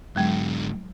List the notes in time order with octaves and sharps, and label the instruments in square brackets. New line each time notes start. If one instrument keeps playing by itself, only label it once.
[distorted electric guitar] G#2 D3 [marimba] F#3 G#3